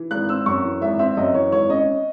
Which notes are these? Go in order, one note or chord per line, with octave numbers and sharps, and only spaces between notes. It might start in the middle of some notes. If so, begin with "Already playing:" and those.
Already playing: E3
G#1 F#6
C4 E6
F#2 C#6
E3
G#1 E5
C4 E5
F#2 D#5
E3 C#5
G#1 C#5
C#4 D#5